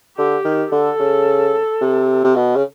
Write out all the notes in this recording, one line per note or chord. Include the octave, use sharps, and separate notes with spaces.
D3 G4
D#3
D3 A4
C#3
C3
C3
B2
C#3